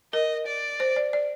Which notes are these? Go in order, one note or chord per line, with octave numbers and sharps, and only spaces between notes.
A#4 D#5
D5
C5
D5
D5